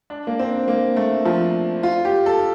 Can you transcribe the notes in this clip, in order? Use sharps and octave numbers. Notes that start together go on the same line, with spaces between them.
D4
A#3
C4
A#3
A3
F3
F4
G4
A4